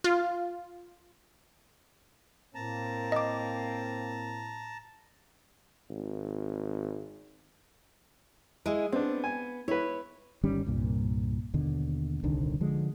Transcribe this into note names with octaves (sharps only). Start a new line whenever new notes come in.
F4
A2 A#3 C4 A5 A#5
D#5 D6
G#1
G#3 E4 G#4
B3 C4 D4
G#5
E4 B4 C#5
G1 D#3 G3 C#4
C2 G2 A#2
D#2 B2 D3
D#1 C2 D3 D#3
D3 F3 G#3